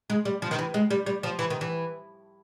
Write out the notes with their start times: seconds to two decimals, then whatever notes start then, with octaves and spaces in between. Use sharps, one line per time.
0.10 G#3
0.25 G3
0.42 F3
0.51 D#3
0.59 E3
0.74 G#3
0.90 G3
1.06 G3
1.23 F3
1.39 E3
1.50 D#3
1.61 E3